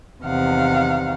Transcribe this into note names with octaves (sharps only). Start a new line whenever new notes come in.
E2 C3 D#3 F5 F#5